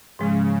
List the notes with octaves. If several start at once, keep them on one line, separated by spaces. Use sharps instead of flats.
G#2 C#3 F3 G#3